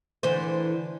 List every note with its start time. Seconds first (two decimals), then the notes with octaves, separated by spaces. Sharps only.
0.23 D3 E3 C5